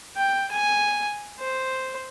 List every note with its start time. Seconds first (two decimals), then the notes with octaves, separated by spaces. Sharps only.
0.16 G5
0.51 G#5
1.39 C5